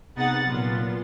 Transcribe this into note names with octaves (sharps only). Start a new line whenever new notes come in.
C3 B3 D#4 G#4 F#5 A6
A#2 F#3 B3 F4